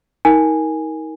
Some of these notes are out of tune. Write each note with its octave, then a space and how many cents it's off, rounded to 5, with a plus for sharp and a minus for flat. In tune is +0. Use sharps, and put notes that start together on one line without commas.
D#4 +35 A#4 +0 G#5 -5